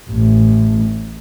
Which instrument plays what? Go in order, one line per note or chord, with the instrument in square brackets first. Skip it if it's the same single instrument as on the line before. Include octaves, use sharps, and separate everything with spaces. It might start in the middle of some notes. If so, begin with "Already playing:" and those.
[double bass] A1 A2